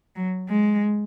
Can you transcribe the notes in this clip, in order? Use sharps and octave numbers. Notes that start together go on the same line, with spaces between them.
F#3
G#3